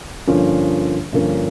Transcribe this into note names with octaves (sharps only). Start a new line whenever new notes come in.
G2 D3 F3 A#3 C#4
G2 D3 F3 A#3 C#4